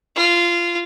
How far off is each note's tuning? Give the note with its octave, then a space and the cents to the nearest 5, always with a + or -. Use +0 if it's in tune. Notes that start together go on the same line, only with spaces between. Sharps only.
F4 -15